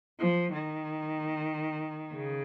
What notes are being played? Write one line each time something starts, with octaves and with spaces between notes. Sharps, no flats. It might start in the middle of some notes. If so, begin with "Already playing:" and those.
F3
D#3
C#3